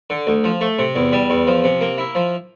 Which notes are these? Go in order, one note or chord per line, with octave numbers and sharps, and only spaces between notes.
D3
D2
F3
A3
C3
E2
G3
E2
F3
C3
A#3
E4
F3